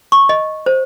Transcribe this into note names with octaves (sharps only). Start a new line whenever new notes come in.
C#6
D#5
C5